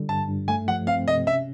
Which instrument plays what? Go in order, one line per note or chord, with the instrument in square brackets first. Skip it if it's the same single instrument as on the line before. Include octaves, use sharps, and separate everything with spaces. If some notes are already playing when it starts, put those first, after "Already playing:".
Already playing: [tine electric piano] D3 G3
[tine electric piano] G2 [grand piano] A5
[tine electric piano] G2
[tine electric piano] A3 [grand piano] G#5
[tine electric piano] F3 [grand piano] F#5
[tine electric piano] C4 [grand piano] F5
[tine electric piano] C3 [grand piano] D#5
[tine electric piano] C#4 [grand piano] E5